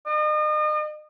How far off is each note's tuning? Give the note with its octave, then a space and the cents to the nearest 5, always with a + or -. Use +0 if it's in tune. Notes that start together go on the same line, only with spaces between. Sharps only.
D#5 -40